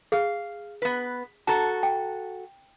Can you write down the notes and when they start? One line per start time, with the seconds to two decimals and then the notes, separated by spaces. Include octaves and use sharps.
0.12 G#4 F5
0.82 B3 B4
1.47 F#4 A4 A5 A#5
1.83 G5